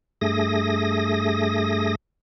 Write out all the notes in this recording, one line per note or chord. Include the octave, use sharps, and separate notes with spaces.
G2 A3 G#4 D#6 A#6